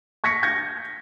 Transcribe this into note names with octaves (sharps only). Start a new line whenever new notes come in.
C#6 G#6 A#6 B6 C#7
G6 G#6 A#6